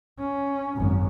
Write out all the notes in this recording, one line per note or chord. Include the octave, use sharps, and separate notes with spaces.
C#4
G#1 F#2